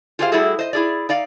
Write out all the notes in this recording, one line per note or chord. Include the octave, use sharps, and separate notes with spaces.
F4 G4 G#4 C5 D5 F5
G3 A3 E4 F#4 G#4 A4
C5 D#5
E4 G#4 D5
D#4 D5 F5